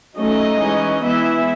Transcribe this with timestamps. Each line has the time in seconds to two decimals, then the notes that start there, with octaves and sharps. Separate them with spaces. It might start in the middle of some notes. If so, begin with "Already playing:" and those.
0.17 F#3 A3 C#4 D#4 D#5
0.61 E3 G#3 C#4
1.04 E3 G#3 B3 E4 E5